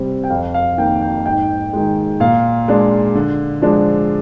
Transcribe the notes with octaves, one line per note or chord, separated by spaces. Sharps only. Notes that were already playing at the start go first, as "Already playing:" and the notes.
Already playing: C3 G3 C4
G5
F2 F5
F5
D#3 A#3 G5
G5
G#2 G5
D#3 G#3
A#2 F5
G#3 D4
D3
F3 G#3 D4